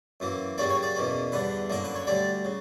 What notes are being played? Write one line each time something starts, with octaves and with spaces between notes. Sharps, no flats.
F#2 E3 A#3
F#2 C#3 G3 A#3 C#4 D5
C#5
D5
E2 B2 A#3 C#4
E2 D3 G3 B4
F#2 D3 A#3 A#4
B4
C#5
D2 D3 G3 D5
C#3